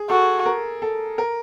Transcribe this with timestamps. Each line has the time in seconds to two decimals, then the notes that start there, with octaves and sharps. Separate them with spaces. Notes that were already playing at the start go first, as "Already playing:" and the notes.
Already playing: G#4
0.10 F#4 A4
0.46 A#4
0.82 A4
1.18 A#4